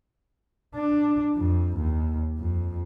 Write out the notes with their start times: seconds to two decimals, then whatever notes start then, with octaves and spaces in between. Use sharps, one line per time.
0.75 D4
1.36 F2
1.77 D#2
2.39 F2